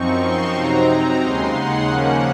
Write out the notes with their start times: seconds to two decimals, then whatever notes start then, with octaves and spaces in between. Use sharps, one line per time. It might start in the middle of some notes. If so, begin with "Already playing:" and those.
Already playing: F#2 F3 C4 D#4 C#6
0.22 C6
0.55 C3 F#3 C4 D#4 A#5
1.20 D#2 C#3 G#3 D#4 C6
1.54 F#5
1.87 C#3 F3 A#3 C#4 F#5